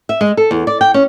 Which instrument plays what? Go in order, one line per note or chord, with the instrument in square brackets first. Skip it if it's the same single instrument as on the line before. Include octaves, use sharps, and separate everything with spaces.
[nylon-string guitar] E5
G#3
A4
E2
D5
G5
C#4